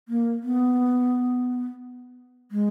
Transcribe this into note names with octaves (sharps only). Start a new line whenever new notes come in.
A#3
B3
G#3